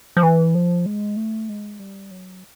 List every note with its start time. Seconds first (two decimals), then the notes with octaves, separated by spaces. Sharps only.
0.17 F3
0.23 E3
0.55 F3
0.86 G#3
1.16 A3
1.49 G#3
1.79 G3
2.11 F#3